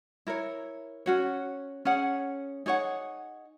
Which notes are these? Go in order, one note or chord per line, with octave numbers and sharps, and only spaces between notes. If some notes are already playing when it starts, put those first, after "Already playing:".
E4 A#4 C#5
C#4 F#4 C#5
C#4 G#4 C#5 F#5
D#4 G#4 C#5 F#5